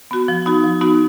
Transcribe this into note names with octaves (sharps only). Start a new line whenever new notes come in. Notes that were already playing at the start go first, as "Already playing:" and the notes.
B3 F#4
F3
B3 D#4 F#4
F3
B3 D#4 F#4